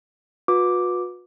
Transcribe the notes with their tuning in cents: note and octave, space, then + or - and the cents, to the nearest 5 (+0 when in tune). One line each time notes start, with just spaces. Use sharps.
F#4 -45 B4 -10 D6 +0